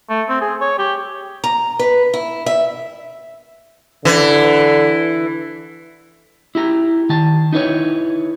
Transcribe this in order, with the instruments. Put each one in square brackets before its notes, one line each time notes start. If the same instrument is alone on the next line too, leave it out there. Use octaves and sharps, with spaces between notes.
[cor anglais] A3
C4
G#4
C#5
G4
[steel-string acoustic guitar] A#5
B4
E4
E5
[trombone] D3 [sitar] E3
[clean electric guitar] E4 G4 A#5
D#3 A5
D#4 E4 B4 C#5